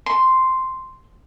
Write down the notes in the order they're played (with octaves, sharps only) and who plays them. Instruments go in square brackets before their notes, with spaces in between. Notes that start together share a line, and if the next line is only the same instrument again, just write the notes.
[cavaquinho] C6